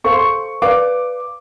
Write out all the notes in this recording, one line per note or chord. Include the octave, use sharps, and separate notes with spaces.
A4 C5 F5 C#6
C6
C#6
B4 D5 F5 D6